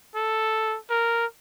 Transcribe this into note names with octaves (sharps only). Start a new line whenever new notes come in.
A4
A#4